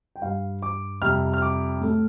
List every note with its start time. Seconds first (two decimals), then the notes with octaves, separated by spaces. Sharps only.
0.16 G5
0.21 G2 G3 F5
0.62 D6
1.02 F2 C3 G3 F6
1.34 F6
1.42 D6
1.81 A2 A3